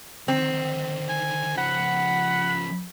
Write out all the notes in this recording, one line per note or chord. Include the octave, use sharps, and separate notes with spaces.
D3 D#3 C4
G#5
C#3 F3 F#5 B5